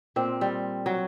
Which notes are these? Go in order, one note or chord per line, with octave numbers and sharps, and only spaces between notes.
A#2 C4
G3
F#3